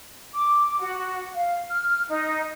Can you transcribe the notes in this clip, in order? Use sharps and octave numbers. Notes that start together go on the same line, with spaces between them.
D6
F#4
F5
F6
D#4